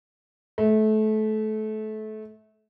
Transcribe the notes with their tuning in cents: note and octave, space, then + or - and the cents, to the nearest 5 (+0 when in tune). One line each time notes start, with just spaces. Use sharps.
A3 -25